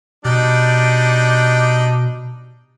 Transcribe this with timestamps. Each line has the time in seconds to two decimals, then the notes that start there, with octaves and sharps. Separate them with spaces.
0.25 B2 G3 D4 D#4